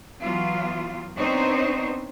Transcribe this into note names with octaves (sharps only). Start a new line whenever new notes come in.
E3 F#3 B3 F4
B3 C4 D4 D#4 C5 C#5